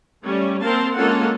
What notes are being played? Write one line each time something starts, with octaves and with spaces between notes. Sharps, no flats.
G3 A3 C#4
A#3 C4 A#4 F5 A5 C6
G#3 A#3 C#4 F4 A4 F#5